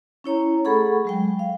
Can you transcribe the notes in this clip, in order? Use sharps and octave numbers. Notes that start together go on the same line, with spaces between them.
C#4 E4 C#5 A#5
A3 G#4 A4 F#5 B5 C#6
F#3 G#3 G5
F5